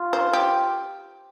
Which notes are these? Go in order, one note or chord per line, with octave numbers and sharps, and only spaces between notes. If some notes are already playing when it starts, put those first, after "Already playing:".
Already playing: F4
C5
G4